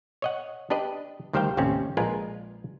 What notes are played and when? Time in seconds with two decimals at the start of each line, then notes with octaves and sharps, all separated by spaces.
0.22 C#5 D#5 F#5
0.70 D4 G4 B4 D#5
1.33 D2 D#3 G3 C5 F5 G5
1.57 A1 D#2 C3 C4 C#4
1.97 A#1 G#3 F4 A#4 B4 G#5